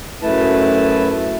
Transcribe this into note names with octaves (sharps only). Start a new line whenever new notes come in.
F#2 A3 E4 B4 A5